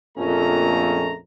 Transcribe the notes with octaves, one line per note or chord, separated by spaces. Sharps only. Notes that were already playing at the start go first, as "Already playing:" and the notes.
A#1 F2 A3 A#3 C#4 A#5